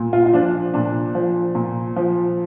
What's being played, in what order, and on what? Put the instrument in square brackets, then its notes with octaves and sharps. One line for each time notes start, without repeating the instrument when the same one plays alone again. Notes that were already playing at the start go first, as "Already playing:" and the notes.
Already playing: [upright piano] A#2
F4
F4
F3 D4
A#2 D4
F3
A#2
F3